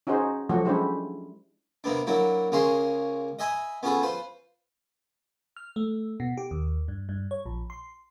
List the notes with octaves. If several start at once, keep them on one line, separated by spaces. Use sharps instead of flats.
C#4 D#4 F#4 G#4 C5
F3 F#3 A3 F#4
G#3 C#4 D4 E4 G4 C5
C3 A#3 B3 D4
F#3 A#3 D4 E4
C#2 A#3 C#4 G#4 C5 C6
D#5 E5 G#5 B5 D#6
B3 C#4 F4 G#4 A4 B4
F4 B4 C5
F6
A3
B2
G4
D#2
G2
G2
C#5
A#1
C6